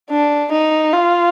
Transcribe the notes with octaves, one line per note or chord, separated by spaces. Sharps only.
D4
D#4
F4